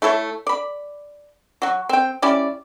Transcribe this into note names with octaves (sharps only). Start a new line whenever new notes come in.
A3 E4 A4 C#5
D5 B5
F#3 F#4
C4 G5
G3 C#4 E4 D5